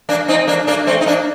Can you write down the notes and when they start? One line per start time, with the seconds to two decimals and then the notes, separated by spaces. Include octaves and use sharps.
0.09 A#3 D4
0.28 C4 D#4
0.47 A#3 D4
0.67 A#3 D4
0.87 A3 C4
1.01 D#4
1.06 A#3 D4